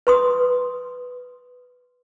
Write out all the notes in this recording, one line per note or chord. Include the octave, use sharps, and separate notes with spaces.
B4 C6 D#6